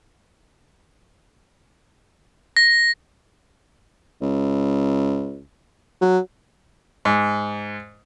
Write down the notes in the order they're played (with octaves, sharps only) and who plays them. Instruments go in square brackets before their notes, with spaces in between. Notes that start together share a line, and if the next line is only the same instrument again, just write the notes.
[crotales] A#6
[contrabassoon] C#2
F#3
[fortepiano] G#2